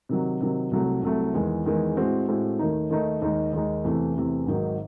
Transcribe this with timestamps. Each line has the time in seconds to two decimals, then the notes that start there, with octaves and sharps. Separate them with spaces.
0.09 C3 D#3 F#3
0.41 C3 D#3 F#3
0.71 C2 C3 F#3 A3
1.02 C2 C3 F#3 A3
1.34 E2 D#3 G#3
1.66 E2 D#3 G#3
1.97 A2 G#3 C4 F#4
2.29 A2 G#3 C4 F#4
2.59 D#2 D#3 A3 D#4
2.90 D#2 D#3 A3 D#4
3.22 D#2 D#3 G#3 D#4
3.53 D#2 D#3 G#3 D#4
3.84 E2 C3 E3 A3
4.16 E2 C3 E3 A3
4.46 G#1 G#2 D#3 F#3